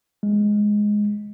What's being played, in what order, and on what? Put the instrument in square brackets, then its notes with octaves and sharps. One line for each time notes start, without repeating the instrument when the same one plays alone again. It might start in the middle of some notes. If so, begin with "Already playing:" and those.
[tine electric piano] G#3